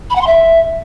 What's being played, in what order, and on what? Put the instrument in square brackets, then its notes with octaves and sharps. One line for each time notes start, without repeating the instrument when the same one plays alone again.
[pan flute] B5
F#5
C6
E5